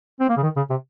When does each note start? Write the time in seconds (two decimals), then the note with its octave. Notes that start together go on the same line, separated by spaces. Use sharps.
0.20 C4
0.29 A#3
0.37 C#3
0.43 D#3
0.56 C#3
0.70 C3